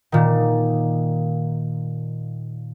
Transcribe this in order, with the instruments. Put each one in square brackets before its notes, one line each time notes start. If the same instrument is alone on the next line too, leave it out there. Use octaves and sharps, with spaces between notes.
[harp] A#2 D#3